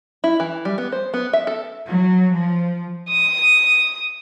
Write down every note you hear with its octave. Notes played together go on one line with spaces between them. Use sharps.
E4
E3
G3
B3
C5
B3
E5
A4
F#3
F3
D#6